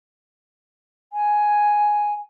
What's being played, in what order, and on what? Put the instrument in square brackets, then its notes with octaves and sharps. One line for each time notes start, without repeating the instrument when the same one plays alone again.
[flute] G#5